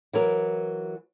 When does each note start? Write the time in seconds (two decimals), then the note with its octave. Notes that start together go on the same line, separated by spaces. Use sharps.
0.13 E3 F#3 A#4